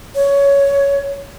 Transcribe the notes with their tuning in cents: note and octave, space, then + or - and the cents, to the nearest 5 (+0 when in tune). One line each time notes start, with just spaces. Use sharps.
C#5 +15